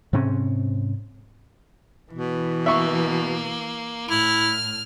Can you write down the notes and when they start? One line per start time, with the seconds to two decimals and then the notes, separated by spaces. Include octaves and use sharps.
0.13 G#2 C3 C4 C#4
2.13 B2 E3
2.66 A#3 E5 C#6
4.09 A2 E4 F6